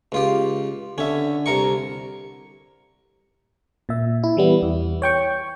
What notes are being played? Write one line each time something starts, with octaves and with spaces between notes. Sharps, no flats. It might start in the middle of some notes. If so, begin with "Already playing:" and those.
C#2 F4 G4
D3 C#4 E5
C2 A#4 C#6
A#2 E5
E4
E3 G3 B3
E2
C#5 G5 C#6